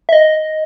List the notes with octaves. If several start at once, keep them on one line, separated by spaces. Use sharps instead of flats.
E5
D#5